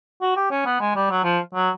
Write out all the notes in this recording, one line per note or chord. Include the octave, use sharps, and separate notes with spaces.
F#4
G4
C#4
B3
G#3
G3
F#3
F3
F#3